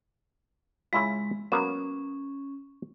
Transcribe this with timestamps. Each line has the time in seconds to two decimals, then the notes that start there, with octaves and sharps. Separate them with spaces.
0.93 C#3 G#3 E4 F4
1.52 F#3 A#3 B3 C#4